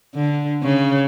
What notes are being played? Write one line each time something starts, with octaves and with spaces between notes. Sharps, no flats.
D3
C#3